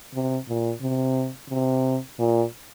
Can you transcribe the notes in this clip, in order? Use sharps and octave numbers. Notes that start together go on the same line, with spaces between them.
C3
A#2
C3
C3
A#2